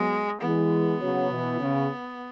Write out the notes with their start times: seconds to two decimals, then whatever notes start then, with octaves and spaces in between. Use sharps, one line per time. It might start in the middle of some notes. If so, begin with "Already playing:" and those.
Already playing: F#3 G#3 B3
0.41 E3 G#3 B3
1.00 C#3 F#3
1.30 B2 E3
1.59 C#3